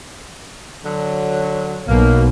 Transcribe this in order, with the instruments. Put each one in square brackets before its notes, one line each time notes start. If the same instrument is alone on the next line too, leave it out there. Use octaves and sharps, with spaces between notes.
[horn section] D3 F#3
[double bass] B1 [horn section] B2 A#3